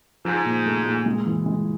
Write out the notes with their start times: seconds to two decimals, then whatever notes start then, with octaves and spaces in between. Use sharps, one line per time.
0.25 G#2 F3
0.45 A#2
0.66 A3
0.86 A#2
1.06 G#3
1.27 E3
1.46 G#3